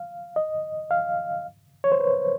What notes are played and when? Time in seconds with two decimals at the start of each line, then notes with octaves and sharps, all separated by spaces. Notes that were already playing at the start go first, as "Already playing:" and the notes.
Already playing: F5
0.36 D#5
0.91 F5
1.84 C#5
1.92 C5
2.00 B4